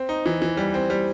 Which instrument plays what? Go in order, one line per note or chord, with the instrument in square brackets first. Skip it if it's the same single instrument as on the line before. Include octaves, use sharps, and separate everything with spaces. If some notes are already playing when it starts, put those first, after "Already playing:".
Already playing: [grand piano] C4
D#4
E3
E3
G3
C4
G3